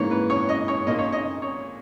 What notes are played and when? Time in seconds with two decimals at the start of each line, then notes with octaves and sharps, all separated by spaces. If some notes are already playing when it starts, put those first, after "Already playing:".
Already playing: G#2 E3 A#3 C#5
0.11 B4
0.30 C#5
0.49 D#5
0.68 C#5
0.87 A#2 A#3 D#4 D#5
0.99 C#5
1.12 D#5
1.42 C#5